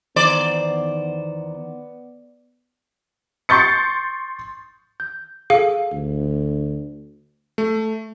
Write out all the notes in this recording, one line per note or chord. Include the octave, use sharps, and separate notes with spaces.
E2 D#3 B3 C5 D5
C6 C#6 G6 A6 C#7
G6
G#4 A4 F5
D2
A3